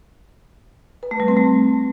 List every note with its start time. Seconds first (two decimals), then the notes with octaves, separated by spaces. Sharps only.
1.03 B4
1.11 A3
1.20 G3
1.28 C4
1.37 A3